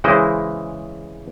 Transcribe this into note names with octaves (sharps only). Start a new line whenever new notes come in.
C#3 E3 G#3 E4 C5 D#5